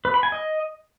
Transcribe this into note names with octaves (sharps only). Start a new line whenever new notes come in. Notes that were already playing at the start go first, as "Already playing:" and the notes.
B4
B5
G#5
D#5